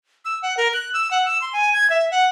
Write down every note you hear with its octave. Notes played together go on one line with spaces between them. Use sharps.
E6
F#5
A#4
F#6
E6
F#5
E6
C6
G#5
G#6
E5
F#5